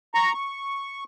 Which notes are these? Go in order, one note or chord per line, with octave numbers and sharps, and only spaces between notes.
A#5 C#6
C#6